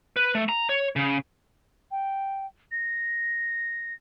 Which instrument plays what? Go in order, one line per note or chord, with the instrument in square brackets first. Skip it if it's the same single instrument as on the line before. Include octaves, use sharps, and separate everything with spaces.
[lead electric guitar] B4
A3
A#5
C#5
C#3
[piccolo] G5
A#6